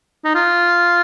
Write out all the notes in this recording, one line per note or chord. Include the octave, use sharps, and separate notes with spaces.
D#4
F4